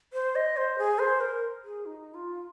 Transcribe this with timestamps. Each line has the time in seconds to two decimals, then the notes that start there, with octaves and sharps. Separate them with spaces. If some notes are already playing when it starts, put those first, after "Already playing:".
0.13 C5
0.35 D#5
0.57 C5
0.78 G#4
0.99 C5
1.21 A#4
1.64 G#4
1.86 D#4
2.14 F4